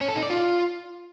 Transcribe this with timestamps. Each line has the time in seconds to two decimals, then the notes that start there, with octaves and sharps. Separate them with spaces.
0.01 C#4
0.08 A4
0.16 D#4
0.23 D5
0.30 F4